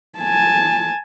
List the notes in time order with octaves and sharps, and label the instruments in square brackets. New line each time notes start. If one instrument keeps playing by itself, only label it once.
[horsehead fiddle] G#5 A5